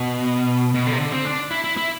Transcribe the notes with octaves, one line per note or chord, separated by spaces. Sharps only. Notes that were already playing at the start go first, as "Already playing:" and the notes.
Already playing: B2
B2
D3
C3
D3
C4
D4
E4
E4
E4